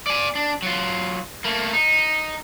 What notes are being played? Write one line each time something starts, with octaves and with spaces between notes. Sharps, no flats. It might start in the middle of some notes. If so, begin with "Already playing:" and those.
D5 G#5
D4
F#3 F4
A3 A#3
D#4